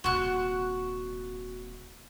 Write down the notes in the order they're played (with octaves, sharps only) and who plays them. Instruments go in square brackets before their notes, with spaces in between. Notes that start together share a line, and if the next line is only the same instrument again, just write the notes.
[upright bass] D#1 C3 [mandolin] F#4 F#6